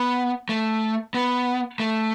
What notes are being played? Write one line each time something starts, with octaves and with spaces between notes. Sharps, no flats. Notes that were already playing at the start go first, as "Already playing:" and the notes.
Already playing: B3
A3
B3
A3